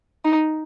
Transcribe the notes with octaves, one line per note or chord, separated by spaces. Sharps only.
D#4